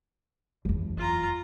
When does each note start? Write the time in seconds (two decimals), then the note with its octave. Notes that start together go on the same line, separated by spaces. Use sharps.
0.65 F#1 E2
0.97 F4 A#5